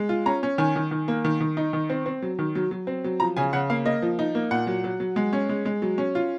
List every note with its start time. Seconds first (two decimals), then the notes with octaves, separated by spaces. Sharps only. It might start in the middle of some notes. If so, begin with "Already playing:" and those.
Already playing: G#3
0.09 F4
0.26 C#4 A#5
0.43 C#4
0.58 D#3 G#5
0.76 D#3
0.91 D#3
1.08 A#3
1.25 D#3
1.41 D#3
1.57 D#4
1.73 D#3
1.90 C4
2.06 C4
2.22 F#3
2.39 D#3
2.55 F#3
2.71 F#3
2.87 C4
3.04 F#3
3.20 F3 A#5
3.37 C#3 G#5
3.53 C#3 F#5
3.70 A#3 F5
3.85 A#3 D#5
4.02 F3
4.19 D#4
4.35 A#3
4.51 A#2 F#5
4.67 F#3
4.84 F#3
5.00 F#3
5.16 G#3
5.33 C#4
5.49 G#3
5.65 G#3
5.82 F#3
5.98 C#4
6.15 F4